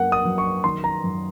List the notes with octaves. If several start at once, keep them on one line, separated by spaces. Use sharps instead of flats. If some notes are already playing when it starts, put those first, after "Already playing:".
Already playing: F#2 A#3 F#5
D#6
F#3
C#6
D#3 C6
A#5
F#2